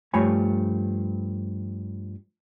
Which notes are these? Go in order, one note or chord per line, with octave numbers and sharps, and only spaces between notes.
G2 F3 A3 C#5 G#5 B5